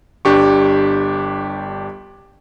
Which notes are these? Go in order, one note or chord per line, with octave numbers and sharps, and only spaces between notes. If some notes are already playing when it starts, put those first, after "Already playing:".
G1 D4 G4 C#6